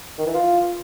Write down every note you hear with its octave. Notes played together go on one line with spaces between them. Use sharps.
D#3
E3
F4